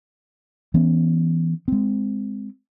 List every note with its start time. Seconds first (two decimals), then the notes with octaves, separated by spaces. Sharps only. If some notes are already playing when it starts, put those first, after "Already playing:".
0.74 E3 B3 C#4
1.68 G#3 C4